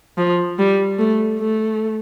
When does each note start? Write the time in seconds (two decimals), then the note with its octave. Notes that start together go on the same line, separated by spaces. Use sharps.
0.18 F3
0.59 G3
0.98 A3
1.39 A3